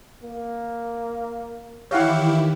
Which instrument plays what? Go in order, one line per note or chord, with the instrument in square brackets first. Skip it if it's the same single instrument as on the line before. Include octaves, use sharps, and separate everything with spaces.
[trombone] A#3
[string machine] D#3 E3 [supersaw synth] E4 G4 [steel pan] C#5 F5 F#5